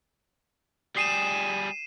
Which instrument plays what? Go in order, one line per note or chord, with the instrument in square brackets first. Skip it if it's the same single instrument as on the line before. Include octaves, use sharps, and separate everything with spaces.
[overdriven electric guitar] G3 G#4 [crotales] C7 D#7 E7